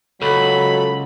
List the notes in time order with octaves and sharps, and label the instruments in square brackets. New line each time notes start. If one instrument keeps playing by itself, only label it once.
[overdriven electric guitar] C#2 [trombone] F#3 [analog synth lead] A4 [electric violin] B5